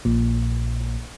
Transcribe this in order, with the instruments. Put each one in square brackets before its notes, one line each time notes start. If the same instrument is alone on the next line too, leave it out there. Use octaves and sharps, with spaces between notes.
[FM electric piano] A#1 A#2